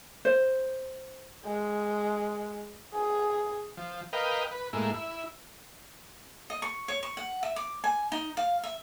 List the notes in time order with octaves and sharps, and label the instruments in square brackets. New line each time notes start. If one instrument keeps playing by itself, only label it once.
[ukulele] C5
[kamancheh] G#3
G#4
[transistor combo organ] F3
A#4 B4 D#5 F5 G5
B4
A2 G#3 A#3 E4
E4
[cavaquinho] D#5
C#6
C#5
C#6
F#5
E5
D6
G#5
D#4
F5
E5